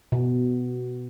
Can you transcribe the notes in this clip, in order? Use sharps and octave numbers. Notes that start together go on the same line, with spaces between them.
B2